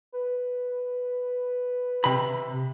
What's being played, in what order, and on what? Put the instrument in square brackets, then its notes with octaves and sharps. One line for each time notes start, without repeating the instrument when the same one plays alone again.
[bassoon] B4
[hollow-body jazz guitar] C3 B5